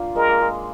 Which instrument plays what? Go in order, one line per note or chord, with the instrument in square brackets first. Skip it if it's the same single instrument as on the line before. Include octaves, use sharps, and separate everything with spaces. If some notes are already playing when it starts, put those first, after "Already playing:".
Already playing: [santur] A#3 D4 F4
[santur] G#3 [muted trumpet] A#4
[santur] A#3
G#3